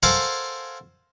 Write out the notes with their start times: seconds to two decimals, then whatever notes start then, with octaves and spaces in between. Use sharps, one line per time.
0.03 A4 A#4 C5 F5 F#5 G#5